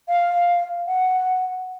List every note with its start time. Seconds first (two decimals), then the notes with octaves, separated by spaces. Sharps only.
0.09 F5
0.88 F#5